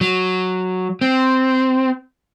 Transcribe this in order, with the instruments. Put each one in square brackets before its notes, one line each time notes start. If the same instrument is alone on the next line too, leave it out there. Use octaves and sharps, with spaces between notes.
[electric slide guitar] F#3
C4